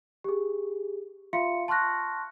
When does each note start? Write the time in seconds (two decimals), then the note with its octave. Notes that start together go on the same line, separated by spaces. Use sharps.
0.24 G4 G#4
1.33 F4 E5 F5 C6 C#7
1.68 A5 C6 C#6 F6 F#6 A#6